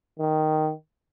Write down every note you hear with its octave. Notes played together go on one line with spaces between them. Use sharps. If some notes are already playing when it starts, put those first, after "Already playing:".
D#3